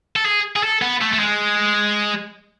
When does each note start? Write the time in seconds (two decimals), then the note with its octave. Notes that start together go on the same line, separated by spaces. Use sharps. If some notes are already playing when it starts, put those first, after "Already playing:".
0.16 A4
0.26 G#4
0.56 G#4
0.63 A4
0.82 B3
1.01 A3
1.13 A3
1.20 G#3